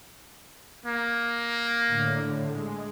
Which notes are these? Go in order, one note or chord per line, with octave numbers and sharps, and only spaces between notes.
A#3
A2 D3
G#3